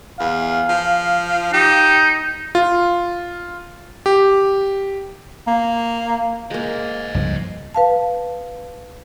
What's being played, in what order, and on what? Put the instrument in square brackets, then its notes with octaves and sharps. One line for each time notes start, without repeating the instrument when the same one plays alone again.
[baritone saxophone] E2 [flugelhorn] F5
[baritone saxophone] F3
[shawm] D#4 [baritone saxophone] G4
[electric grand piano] F4
G4
[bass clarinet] A#3
[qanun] G#3 A#3 [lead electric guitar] C5 D#5
[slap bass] C#2 G2 F3
[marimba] B4 F5 A5